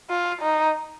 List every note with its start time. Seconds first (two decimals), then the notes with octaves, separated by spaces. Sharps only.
0.10 F4
0.41 D#4